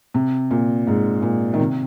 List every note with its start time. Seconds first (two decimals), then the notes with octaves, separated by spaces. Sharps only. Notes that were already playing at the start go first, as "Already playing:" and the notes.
0.14 C3
0.51 A#2
0.87 G#2
1.22 A#2
1.54 D#3
1.60 C3